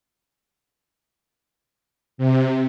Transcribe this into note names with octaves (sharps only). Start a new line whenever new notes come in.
C3